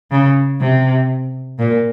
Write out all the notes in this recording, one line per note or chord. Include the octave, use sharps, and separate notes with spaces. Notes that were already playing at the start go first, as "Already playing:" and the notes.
C#3
C3
A#2